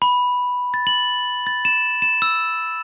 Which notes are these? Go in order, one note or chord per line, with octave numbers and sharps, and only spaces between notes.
B5
A6
F#7
A6
E7
E7
E6